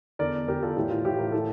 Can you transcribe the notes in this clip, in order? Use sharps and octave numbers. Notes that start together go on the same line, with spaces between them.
E2 D3 A#4 D5
E2 D3 G4 A#4
F4 A4
A2 E3 G4
F4
A2 E3 G4
A#4
A2 E3 A4